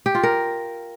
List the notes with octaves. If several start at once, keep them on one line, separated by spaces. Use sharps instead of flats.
G4
F4
A#4